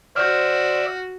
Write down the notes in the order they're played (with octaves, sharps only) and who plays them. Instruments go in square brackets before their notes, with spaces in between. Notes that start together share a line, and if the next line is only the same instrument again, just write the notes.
[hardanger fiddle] F#4 [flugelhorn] C5 [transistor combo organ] D5 E5 [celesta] F6 G6